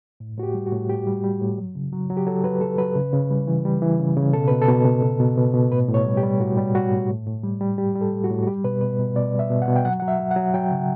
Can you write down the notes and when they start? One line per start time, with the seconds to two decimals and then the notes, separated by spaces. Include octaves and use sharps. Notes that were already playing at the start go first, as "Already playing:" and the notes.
0.20 A2
0.38 A2 F#4
0.43 G4
0.54 G3
0.66 F#4
0.72 A2
0.90 A2 G4
1.07 G3
1.24 G3
1.41 A2
1.58 F#3
1.75 C#3
1.92 F#3
2.10 F#3
2.17 G4
2.27 F#3 A4
2.44 F#3 B4
2.61 F#3 A4
2.78 F#3 B4
2.96 C#3
3.13 C#3
3.30 G3
3.47 E3
3.65 G3
3.82 E3
4.00 C#3
4.17 C#3
4.33 B2 A4
4.48 B2 B4
4.62 A4
4.68 B2
4.85 B2
5.03 B2
5.20 B2
5.38 B2
5.54 B2
5.71 A2 B4
5.89 A2
5.94 C#5
6.06 G3
6.17 G4
6.23 G3
6.40 A2 F#4
6.57 G3
6.75 G3 F#4
6.92 A2
7.09 A2
7.27 A2
7.44 G3
7.61 G3
7.78 G3 G4
7.95 G3
8.01 A4
8.13 A2
8.24 F#4
8.30 A2
8.43 F#4
8.47 G3 G4
8.64 B2 B4
8.81 B2 B4
8.99 B2
9.16 B2 D5
9.34 G3
9.39 E5
9.50 B2
9.62 F#5
9.68 B2
9.76 G5
9.85 F#3 F#5
10.00 F#3 F#5
10.08 E5
10.19 F#3
10.31 F#5
10.36 F#3
10.54 F#3 G5
10.71 C#3